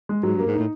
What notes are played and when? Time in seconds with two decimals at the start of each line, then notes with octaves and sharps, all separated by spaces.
0.09 G#3
0.23 G#2 F#3
0.35 G2
0.39 A#3
0.46 G#2
0.54 A2 D#4